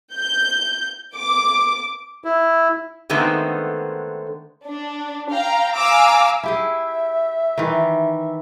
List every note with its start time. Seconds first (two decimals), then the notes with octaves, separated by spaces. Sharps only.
0.14 G6
1.16 D6
2.24 E4
3.10 D3 D#3 G#3 A3 B3 C4
4.66 D4
5.31 F5 G5 A#5
5.75 F5 G#5 A#5 D6 E6
6.43 E4 G4 G#4 E5
7.58 D#3 E3